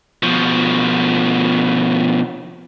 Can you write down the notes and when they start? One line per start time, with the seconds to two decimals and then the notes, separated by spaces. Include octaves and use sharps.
0.23 B2 F3